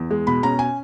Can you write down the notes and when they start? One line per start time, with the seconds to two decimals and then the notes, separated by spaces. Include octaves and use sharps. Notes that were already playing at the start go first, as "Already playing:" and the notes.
Already playing: E2
0.11 G#3
0.27 B2 B5
0.43 C#4 A#5
0.59 G#5